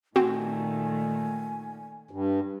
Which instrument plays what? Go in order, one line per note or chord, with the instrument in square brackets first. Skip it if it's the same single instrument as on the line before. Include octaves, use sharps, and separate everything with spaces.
[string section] A#2 D#3 A3 [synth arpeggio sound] C4 F#4 [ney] G#5
[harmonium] G2